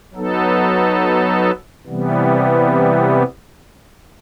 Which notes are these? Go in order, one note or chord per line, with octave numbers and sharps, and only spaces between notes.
F#3 B3 D#4 A4
C3 E3 G3 B3